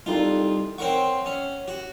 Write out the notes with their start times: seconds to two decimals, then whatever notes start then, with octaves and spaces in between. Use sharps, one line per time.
0.06 C2 G3 D#4 F4 A4
0.78 C4 A#4 C#5 F#5 C#6
1.26 C#4
1.68 F#4